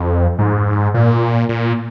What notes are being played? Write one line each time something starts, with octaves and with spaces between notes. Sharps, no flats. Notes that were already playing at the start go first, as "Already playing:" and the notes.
Already playing: F2
G#2
A#2
A#2